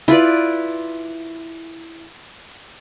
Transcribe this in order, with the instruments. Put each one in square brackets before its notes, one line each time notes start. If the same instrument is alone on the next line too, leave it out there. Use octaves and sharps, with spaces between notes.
[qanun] E4 F4 B4 D5